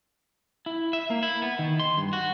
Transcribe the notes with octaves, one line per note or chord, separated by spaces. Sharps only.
E4
E5
A#3
E4
B3
D#3
C6
G2
F#4